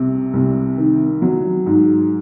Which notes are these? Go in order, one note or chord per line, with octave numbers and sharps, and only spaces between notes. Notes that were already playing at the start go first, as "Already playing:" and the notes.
Already playing: C2 C3
C2
D#3
F#3
G#2